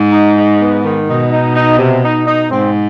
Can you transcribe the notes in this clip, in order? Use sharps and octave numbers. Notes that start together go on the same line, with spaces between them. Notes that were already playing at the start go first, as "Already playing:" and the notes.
Already playing: G#2
D#4
D#4
B3
D#3
B2 D#4
D#4
D#4
C3
D#4
D#4
G#2 C4